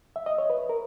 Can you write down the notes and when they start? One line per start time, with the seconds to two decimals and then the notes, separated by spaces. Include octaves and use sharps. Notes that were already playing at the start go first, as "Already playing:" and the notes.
0.16 E5
0.26 D#5
0.38 C#5
0.50 B4
0.69 A#4